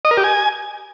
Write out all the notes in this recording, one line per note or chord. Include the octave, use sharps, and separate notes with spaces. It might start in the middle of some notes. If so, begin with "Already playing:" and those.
D#5
A#4
G4
G#5